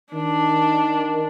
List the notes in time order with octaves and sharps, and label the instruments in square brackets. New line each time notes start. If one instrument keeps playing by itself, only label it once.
[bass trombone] D#3 [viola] D4